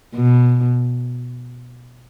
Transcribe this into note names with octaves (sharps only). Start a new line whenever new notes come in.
B2